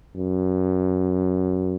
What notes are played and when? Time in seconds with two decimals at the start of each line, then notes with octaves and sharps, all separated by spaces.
0.16 F#2